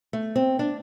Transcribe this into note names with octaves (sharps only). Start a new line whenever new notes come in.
A3
C4
D4